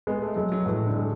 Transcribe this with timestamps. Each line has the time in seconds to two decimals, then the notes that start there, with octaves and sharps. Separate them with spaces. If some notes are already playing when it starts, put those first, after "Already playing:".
0.07 G#3 B3
0.22 A3
0.36 F#3 G#3
0.52 F#3
0.66 A2 E3
0.87 D3
0.96 G#3